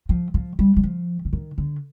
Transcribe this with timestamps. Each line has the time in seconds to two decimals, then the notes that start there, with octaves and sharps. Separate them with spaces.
0.09 F3
0.34 F3
0.59 G3
0.77 G3
0.83 F3
1.25 D3
1.33 D#3
1.58 D3